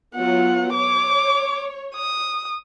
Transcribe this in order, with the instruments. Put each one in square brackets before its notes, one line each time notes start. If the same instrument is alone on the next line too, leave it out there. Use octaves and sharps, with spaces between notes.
[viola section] F#3 B3 F4 [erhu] F#5
[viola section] C#5 [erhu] D6
[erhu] D#6